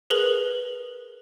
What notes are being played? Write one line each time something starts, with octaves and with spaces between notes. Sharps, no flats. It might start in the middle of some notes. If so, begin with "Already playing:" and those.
G#4 A#4 B4 F#7